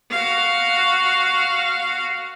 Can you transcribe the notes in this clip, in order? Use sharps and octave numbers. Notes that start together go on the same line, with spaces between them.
F#4 F5